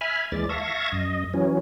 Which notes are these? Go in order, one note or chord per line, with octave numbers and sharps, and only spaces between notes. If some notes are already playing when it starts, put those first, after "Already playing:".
E5 G#5 B5 F6
D#2 E3 G#3 D5 A6
E5 F5 A5 C#6 G#6 A#6
F#2 D#5
E3 F#3 C#4